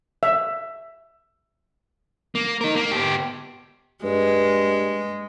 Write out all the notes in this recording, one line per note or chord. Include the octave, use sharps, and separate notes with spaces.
E5
A#3
D#4 A#4
A#3
B3 G4
G2 G#3